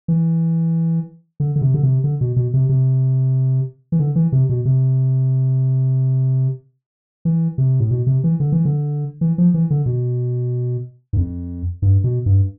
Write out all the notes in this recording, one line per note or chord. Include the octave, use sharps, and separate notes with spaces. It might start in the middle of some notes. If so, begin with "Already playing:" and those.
E3
D3
D3
C3
D3
C3
D3
B2
B2
C3
C3
E3
D3
E3
C3
B2
C3
E3
C3
A2
B2
C3
E3
D3
E3
D3
E3
F3
E3
D3
B2
G2
F2
G2
B2
G2